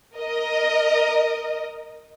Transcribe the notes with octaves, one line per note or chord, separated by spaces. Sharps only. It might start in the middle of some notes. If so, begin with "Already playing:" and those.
A#4 D#5